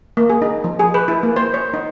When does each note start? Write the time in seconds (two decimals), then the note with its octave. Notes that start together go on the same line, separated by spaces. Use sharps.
0.17 A#3
0.30 G#4
0.42 D#4
0.64 F3
0.79 G#4
0.94 B4
1.08 E4
1.23 A#3
1.36 C5
1.54 C#5
1.74 D#4